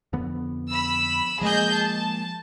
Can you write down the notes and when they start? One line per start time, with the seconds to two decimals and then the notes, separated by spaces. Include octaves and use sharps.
0.13 F2 D3 B3
0.70 B5 E6
1.41 F3 G#3 A#3 G#4 D#5 G6
1.74 A5